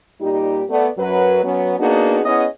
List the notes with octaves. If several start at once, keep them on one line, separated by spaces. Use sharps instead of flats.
A#2 G3 D#4 G4
A3 B3 D5
F#2 F#3 B4
F#3 B3 C#4
A#3 B3 D4 D#4 F#4 G#4
B3 C#4 E4 G#4 D#5